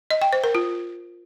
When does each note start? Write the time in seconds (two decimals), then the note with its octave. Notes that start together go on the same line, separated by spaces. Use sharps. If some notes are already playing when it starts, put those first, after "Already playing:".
0.11 D#5
0.22 G5
0.33 C5
0.44 A#4
0.55 F4